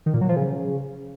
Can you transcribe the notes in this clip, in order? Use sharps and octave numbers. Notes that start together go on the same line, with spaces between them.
D#3
A#2
F#3
F3
C#3